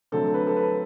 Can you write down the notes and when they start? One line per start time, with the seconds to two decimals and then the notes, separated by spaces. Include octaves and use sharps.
0.12 D3 F#3 A3 C4 A4
0.34 B4
0.47 A4
0.56 B4